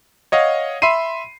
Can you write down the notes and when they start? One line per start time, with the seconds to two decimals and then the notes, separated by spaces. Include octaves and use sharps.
0.32 C#5 D#5 F5 F#5
0.82 E5 B5 C6 C7 D#7